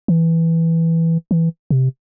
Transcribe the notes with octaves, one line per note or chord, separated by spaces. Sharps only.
E3
E3
C3